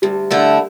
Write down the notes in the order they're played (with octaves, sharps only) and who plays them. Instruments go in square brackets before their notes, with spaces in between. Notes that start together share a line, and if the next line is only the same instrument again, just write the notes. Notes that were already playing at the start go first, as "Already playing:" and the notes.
[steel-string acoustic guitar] D2 [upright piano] G3
[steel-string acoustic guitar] D3 A3 E4